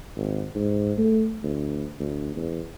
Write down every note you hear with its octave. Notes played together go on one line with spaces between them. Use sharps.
G#1
G#2
A3
D2
D2
E2